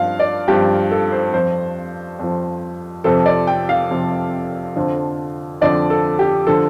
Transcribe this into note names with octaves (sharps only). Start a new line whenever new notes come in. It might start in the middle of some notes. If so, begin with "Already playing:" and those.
Already playing: G2 F3 F5
D5
G2 F3 G4
A4
C5
F2 F3 C5
F2 F3
F2 C3 F3 A4
D5
G5
F5
F2 C3 F3
F2 D3 F3
F2 D3 F3 D5
A4
G4
D3 F3 A4